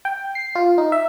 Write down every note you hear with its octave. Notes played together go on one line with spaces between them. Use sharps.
G5
C7
F4
D#4
E5